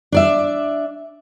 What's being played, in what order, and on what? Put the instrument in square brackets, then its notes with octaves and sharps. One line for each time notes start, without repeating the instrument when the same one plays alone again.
[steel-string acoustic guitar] D4 D5 E5